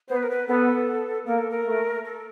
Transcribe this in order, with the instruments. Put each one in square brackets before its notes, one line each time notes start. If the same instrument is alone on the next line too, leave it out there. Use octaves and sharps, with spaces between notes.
[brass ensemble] B3 [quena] C5
[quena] B4
A#4
B4
[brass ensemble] B3 [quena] A4
[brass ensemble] A#3 [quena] A#4
[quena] A4
A#4
[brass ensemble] A3
[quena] A4